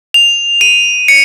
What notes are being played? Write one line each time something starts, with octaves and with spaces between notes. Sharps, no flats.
F7
D#7
C#7